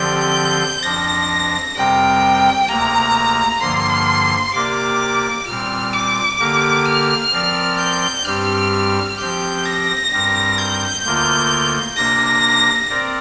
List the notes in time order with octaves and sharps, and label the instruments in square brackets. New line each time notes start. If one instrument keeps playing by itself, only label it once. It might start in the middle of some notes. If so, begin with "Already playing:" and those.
Already playing: [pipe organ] D3 F3 C4 G4 D5 [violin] G6
[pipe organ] F2 F3 D4 [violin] A#6
[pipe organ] F2 C3 G3 C4 A#4 [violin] G5
[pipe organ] D2 C3 A#3 [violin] A#5
[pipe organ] G2 D3 F3 A#3 [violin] C6
[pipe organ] C3 A#3 G4 A#4 D5 [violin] D6
[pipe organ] A#2 G3 C4 [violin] F6
[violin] D6
[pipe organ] D3 A#3 G4 A#4
[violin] F6
[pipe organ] F3 C4 A#4 D5
[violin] G6
[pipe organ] G2 G3 C4 G4 [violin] F6
[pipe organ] F3 C4 G4 [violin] G6
[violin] A#6
[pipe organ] G2 G3 C4 A#4
[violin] G6
[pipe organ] D2 D3 A#3 F4 A#4
[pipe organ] C3 A#3 D4 [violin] A#6
[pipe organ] C4 A#4 D5